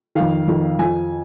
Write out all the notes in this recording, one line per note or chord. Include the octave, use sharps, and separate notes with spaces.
F2 D#3 F5
F2 D#3
F2 F3 G#5